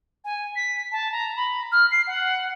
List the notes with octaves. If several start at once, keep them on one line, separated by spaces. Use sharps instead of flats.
G#5
B6
A5
A#5
B5
F6
C7
F#5